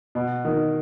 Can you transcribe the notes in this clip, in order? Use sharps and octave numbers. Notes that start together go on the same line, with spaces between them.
B2
D#3